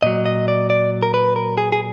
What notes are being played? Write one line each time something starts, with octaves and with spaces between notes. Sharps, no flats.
A#2 F#3 D#5
D#5
D5
D5
A#4
B4
A#4
G#4
G#4